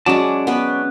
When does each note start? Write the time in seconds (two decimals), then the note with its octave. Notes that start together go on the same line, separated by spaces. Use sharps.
0.06 F#3 G#3 C#4 D5 A5
0.47 B3 B4